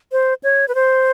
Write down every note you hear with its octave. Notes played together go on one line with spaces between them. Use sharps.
C5
C#5
B4
C5